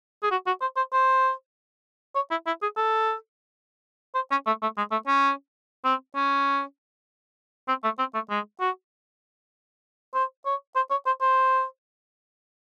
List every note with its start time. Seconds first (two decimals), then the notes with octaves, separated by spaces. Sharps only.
0.23 G#4
0.31 F#4
0.47 F#4
0.61 C5
0.77 C5
0.93 C5
2.15 C#5
2.31 E4
2.47 E4
2.62 G#4
2.77 A4
4.15 C5
4.31 C#4
4.47 A3
4.62 A3
4.77 G#3
4.91 A3
5.08 C#4
5.85 C4
6.16 C#4
7.68 C4
7.84 A3
7.99 C4
8.14 A3
8.30 G#3
8.60 F#4
10.14 C5
10.46 C#5
10.76 C5
10.91 C#5
11.06 C5
11.21 C5